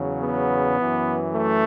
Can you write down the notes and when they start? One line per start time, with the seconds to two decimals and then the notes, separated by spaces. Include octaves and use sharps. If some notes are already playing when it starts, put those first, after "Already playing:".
Already playing: E2 C#3 F#3
0.21 B3
0.78 F#2 E3
1.33 A3